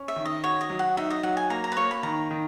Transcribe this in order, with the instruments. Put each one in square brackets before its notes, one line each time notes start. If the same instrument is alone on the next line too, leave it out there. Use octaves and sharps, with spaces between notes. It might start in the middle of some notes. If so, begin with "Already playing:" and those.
Already playing: [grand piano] C#4
[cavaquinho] E5
[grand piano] D#3
[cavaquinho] D#5
[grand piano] F#4 [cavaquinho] C#5
[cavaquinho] D#5
[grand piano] F#3
[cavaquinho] F#5
[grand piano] D#4 [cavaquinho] E5
[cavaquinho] D#5
[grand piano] F#3 [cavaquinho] F#5
[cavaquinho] G#5
[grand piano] A#3 [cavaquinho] A#5
[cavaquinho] A#5
B4
[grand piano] A#3 [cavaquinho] C#5
[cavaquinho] B5
[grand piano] D#3 [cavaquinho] A#5
[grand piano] D#3